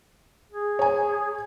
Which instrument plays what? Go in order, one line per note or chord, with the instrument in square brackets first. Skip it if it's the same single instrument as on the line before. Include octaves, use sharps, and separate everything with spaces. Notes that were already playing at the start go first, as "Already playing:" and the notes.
[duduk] G#4
[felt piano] C#5 G#5